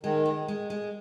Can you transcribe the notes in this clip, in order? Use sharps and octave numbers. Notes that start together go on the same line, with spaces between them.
D#3 G#3
G#3
G#3
G#3